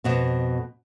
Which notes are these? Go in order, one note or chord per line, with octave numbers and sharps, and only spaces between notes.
F2 B2 C4